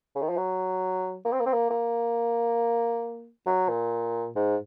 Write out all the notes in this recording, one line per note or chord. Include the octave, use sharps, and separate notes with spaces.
C#3
D#3
F3
F#3
A#3
C4
A#3
C4
A#3
A#3
F#3
A#2
G#2